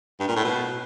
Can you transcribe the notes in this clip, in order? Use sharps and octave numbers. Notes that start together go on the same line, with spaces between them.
G2
A#2
A2
B2